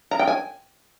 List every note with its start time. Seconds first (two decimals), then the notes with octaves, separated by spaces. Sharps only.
0.11 A#5
0.19 G5
0.27 G#5